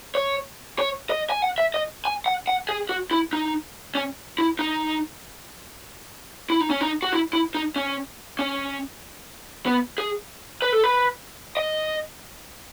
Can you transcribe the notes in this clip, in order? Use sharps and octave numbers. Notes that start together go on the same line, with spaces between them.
C#5
C#5
D#5
G#5
F#5
E5
D#5
G#5
F#5
F#5
G#4
F#4
E4
D#4
C#4
E4
D#4
E4
D#4
C#4
D#4
F#4
E4
E4
D#4
C#4
C#4
B3
G#4
B4
A4
B4
D#5